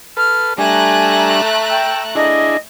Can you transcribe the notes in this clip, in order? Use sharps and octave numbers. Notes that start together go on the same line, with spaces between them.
A4 B4 F6
G3 A3 D4 G#5 A#5 F#6
G5 E6
D4 E4 G#4 D#5